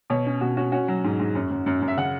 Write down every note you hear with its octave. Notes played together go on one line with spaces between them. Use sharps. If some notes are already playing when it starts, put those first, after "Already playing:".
B2 C#5
C#4
B2 F#4
C#4 F#4
C#4 F#4
F#3
G#2
G#2
F#2
F#2
F#2
F#2
E5
C#3 F#5